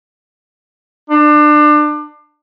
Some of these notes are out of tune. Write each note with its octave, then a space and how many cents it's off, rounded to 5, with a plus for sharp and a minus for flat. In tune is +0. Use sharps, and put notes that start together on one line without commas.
D4 +30